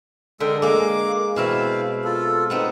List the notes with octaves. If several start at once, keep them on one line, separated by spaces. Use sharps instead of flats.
D3 G#3 A4 A#4 G5
G#3 A#3 D6
B2 C4 E4 E5 F5
F4 A4
B3 C4 D#4